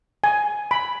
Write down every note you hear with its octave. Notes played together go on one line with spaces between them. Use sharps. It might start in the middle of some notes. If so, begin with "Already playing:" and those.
G#5
B5